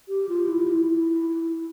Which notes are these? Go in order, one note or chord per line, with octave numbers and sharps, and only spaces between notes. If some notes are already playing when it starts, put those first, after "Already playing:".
G4
F4
E4
F4
E4